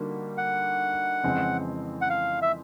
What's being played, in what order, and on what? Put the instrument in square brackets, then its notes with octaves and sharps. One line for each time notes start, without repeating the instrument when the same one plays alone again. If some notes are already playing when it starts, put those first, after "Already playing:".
Already playing: [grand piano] D3 G3 A#3 D#4 F#4
[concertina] F#5
[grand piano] F2 C#3 E3 G#3 C4
[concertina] F#5
F5
E5